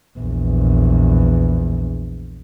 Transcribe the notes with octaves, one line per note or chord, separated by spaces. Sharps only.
A#1 E2